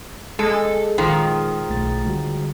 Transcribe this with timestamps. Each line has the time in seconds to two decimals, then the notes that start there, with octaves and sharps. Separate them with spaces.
0.39 G#3 A4
0.98 A#1 D#3 F3
1.70 B1 A3 A6
2.06 D3 G3 F#4